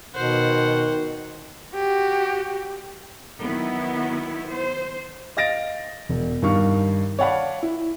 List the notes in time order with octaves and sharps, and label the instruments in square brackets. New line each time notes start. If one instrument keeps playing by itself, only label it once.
[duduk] B2 [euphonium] D#3 [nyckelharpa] C5 F#5
[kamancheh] F#4 G4
[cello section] D#3 F#3 B3 E4
C5
[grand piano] D#5 F5 A6 A#6 D7
E1
G2 D#3 F5 C#6
C#5 D5 F5 F#5 A5 B5
E4